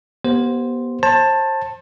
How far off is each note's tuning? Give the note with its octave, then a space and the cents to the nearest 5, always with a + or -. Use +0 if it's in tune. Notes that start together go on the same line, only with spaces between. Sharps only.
B3 -30 G4 -5 C5 +0
C5 +35 A5 +10